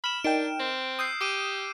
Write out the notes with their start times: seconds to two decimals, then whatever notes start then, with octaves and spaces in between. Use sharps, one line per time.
0.04 B5 F6 E7
0.24 D4 D#4 A#4 G5 D7
0.60 C4
0.99 D#6 E6 G6 C7
1.21 G4 D6 D7 D#7